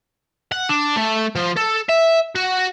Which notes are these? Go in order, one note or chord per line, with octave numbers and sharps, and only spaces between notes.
F#5
D4
A3
F3
A4
E5
F#4